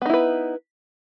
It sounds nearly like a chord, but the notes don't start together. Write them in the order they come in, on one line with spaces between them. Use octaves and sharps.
B3 D#4 E4 B4